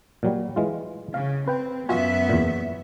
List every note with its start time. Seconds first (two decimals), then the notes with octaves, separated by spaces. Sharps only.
0.23 A#2 F#3 G3
0.56 E3 G#3 F4
1.14 C#3 F5
1.48 C4 B4 G5
1.89 F#2 B3 F4 F#4 E5 G#5
2.29 E2 A#2